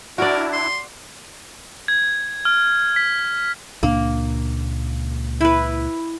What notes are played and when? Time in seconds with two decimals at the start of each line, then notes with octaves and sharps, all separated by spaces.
0.18 D4 E4 F#4 A#4 D5
0.53 C6
1.88 G#6
2.45 F6
2.96 B6
3.83 C#2 A#2 A#3 D4
5.41 E4 B4